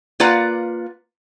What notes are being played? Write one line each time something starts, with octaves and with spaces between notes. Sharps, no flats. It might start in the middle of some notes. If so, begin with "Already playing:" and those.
A#3 F4 B4 D5 F#5 A#5